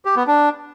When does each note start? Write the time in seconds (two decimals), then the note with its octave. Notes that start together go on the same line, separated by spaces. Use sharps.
0.05 G4
0.16 B3
0.27 D4